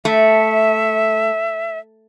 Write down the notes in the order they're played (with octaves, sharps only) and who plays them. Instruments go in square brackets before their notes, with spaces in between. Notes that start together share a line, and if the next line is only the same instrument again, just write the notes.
[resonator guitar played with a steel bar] A3 [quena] E5